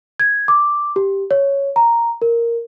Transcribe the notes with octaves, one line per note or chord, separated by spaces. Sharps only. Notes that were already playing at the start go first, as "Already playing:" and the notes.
G#6
D6
G4
C#5
A#5
A#4